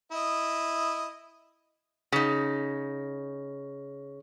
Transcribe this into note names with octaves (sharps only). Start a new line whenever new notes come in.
E4 D#5
C#3 D#4